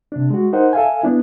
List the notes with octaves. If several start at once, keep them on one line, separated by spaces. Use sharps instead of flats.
C3 D4
G#3 F#4
D#4 A#4 C5 F#5
A4 E5 F5 G#5
B3 D4 E4